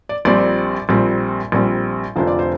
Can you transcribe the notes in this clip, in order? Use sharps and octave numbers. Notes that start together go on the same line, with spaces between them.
D5
A#1 A#2 G3 C4 D5
A#1 A#2 G3 C4
A#1 A#2 G3 C4
F1 F2 D3 F3 D4 C5
D5
C5